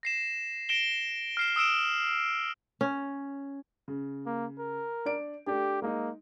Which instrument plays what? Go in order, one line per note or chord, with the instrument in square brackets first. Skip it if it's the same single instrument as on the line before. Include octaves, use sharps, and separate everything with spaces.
[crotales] A#6 C7 E7
A#6 D7 E7 G7
F6 C7 E7
D#6 E6 D7 E7
[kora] C#4
[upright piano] C#3
[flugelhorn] A#3
A#4
[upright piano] D4 D5 D7
[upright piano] A3 D4 [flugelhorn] G4
[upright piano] G#3 D#4 [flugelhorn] A#3